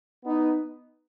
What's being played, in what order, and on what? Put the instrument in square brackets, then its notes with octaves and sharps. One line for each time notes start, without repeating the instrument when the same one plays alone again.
[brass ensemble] B3 D#4